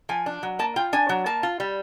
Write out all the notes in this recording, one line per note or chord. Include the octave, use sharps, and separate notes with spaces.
F3 G#5
D4
F#3
A#3 A5
F4 G5
D4 G#5
F#3
A#3 A5
F4
G3